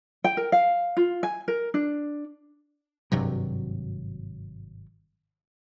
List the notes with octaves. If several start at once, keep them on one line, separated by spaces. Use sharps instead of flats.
G5
A#4
F5
F4
G#5
A#4
D4
G#1 G2 C3 F#3